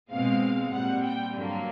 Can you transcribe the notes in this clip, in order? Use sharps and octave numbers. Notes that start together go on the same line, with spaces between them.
B2 G#3 C4 F5
A#2 G3 C4 F#5
G5
G2 D3 F#3 A#3